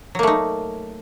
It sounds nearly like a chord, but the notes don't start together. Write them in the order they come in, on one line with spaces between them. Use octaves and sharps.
F#3 A#3 A3 D#4